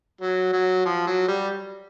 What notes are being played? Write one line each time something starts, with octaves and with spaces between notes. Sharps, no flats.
F#3
F#3
F3
F#3
G3